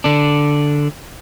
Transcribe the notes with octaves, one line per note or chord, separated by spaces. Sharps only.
D3 D4